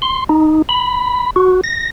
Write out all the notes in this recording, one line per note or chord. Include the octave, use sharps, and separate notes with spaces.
C6
D#4
B5
F#4
A#6